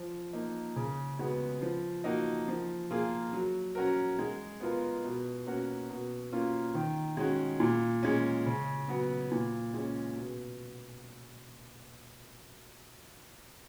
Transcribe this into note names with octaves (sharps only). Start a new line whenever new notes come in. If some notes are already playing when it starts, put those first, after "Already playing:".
Already playing: F3
A#3 D#4
C#3
G#3 B3 F#4
F3
A#3 D#4 F#4
F3
A#3 F4 G#4
F#3
C#4 F#4 A#4
G#3
B3 F4 A#4
B2
A#3 C#4 F#4 A#4
B2
A#3 C#4 F4
D#3
G#3 C#4 F#4
A#2
G#3 C#4
C#3
F#3 B3 F#4
A#2
G#3 C#4
B2